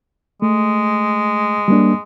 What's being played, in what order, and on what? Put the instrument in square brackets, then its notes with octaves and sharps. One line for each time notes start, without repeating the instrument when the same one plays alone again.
[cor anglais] G#3 [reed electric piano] A3
[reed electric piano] G3 A#3 D4